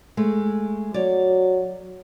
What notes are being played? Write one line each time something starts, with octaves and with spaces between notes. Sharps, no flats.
G#3 A3
F#3 C#5 D5